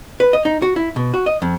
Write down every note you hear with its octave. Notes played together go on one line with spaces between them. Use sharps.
B4
D#5
D#4
F#4
E4
B2
F#4
D#5
F2